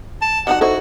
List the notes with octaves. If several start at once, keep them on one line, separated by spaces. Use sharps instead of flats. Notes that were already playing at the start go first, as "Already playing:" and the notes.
A5
G3 D#4 F#4 F#5
D#4 E4 F#4 A4 C5